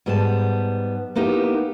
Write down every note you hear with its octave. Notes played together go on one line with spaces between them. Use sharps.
G#2 G3 B3 A4 A5
A#3 B3 D#4 E4 G4